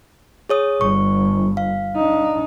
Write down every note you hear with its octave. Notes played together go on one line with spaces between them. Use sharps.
G#4 C#5 D#6
G1 C#6
F5
D4 D#4